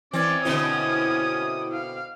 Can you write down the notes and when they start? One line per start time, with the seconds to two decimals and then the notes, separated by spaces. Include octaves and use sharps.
0.13 E3 C4 C#4 D5
0.45 B2 D3 C4 E4 D#6
1.73 F5